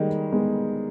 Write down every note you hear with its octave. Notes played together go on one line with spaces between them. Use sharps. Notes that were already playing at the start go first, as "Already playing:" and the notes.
Already playing: D#3 G3 G#3 A#3
G#3 B3